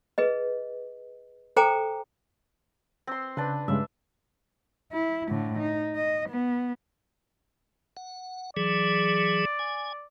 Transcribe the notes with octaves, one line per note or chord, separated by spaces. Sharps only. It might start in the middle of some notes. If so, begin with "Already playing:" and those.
G#4 B4 D#5
A4 C5 G5 G#5 A#5 D6
C4 C6
C#3 D4 B4
G2 C#3 G#3 E5
E4
A2 D3
D#4
D#5
B3
F#5
E3 F#3 G#4 D5
G#5